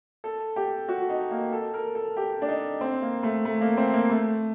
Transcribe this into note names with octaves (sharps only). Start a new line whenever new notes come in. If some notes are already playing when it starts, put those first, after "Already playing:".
A4
G4
F#4
D#4
A#3
A4
A#4
A4
G4
D4
D#4
C4
A#3
A3
A3
A#3
C4
A#3
A3